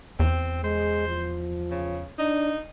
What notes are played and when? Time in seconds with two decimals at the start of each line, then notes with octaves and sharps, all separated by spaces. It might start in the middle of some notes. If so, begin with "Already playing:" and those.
0.20 E2 C4
0.64 G#3 C5
1.08 F3
1.71 C#3
2.19 D4 D#4